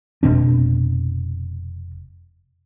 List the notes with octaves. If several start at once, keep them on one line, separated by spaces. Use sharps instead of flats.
F1 B2 C4 D4